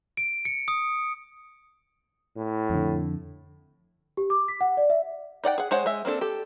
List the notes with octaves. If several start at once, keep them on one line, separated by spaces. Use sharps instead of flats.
D7
C#7
D#6
A2
F2 D3
G4
D6
B6
F#5
D5
E5
D#4 D5 F#5 G5
G#4 F#5
G#3 G#4 C5 C#5 F#5
G#3 E5
A#3 C4 D4 A4
G4 A4